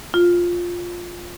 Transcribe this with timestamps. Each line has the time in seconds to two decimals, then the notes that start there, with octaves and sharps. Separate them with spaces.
0.14 F4